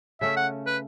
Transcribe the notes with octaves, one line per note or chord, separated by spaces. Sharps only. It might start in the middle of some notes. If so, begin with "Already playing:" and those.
C#3 A3 C#4 E5
F#5
B4